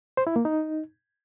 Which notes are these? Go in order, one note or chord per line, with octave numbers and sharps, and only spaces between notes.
C5
E4
A#3
D#4